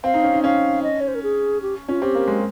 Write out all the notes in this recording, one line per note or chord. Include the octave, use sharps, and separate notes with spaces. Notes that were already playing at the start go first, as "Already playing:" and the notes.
C4 F5
D#4
C#4
D#4
C#4 F5
D#5
C#5
C5
A#4
G#4
G4
C#4 F4
C4 G4
A#3
G#3